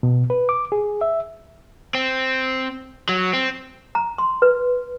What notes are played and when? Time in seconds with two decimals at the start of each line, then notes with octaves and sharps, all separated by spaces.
0.03 B2
0.30 B4
0.49 D6
0.72 G#4
1.01 E5
1.95 C4
3.09 F#3
3.33 C4
3.95 A#5
4.18 C6
4.42 B4